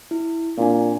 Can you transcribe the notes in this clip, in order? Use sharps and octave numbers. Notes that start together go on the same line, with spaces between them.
E4
A#2 C4 D4 G#5